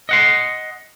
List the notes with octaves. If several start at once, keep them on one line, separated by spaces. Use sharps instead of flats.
D#5 F#5 C6